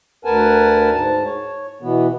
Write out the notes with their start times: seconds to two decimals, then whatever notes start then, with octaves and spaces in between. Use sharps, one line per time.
0.25 D2 A#4 B4 F#5 G#5 A5
0.94 G#2 A5
1.25 C#5
1.82 B2 E3 B3